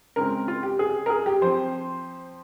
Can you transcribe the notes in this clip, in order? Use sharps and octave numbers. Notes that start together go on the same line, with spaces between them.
C#3 G#3 C4 A#4
F4
G4
G#4
A#4
G#4
G4
F3 C4 C5